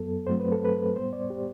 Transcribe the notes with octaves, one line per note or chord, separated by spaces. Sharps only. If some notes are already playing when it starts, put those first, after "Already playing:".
Already playing: F#2 F#3 B3 A4
G2 F#3 A3 C4 C5
B4
A4
B4
A2 G3 B3 C5
D5
G4